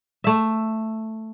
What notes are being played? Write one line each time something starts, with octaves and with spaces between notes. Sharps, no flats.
A3 E5